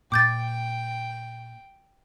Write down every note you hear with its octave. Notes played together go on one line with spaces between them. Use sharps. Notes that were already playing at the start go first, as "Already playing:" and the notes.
A#2 G5 D6 G6 A6